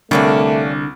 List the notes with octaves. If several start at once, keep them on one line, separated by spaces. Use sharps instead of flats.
C2 D3 A3 A#3 C#4 D4